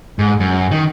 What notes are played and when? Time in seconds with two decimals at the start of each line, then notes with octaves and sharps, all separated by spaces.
0.19 G#2
0.40 F#2
0.71 D#3